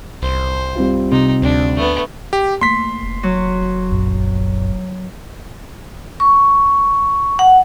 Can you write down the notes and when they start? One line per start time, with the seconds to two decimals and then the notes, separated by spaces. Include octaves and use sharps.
0.22 C2 C5
0.75 G3 C4 F4
1.12 C3 D#4
1.42 D2 D4
1.76 A3 B3
2.33 G4
2.61 A3 A#3 C6 B6
3.03 F1
3.23 F#3
3.91 A#1 F#2
6.20 C#6
7.39 F#5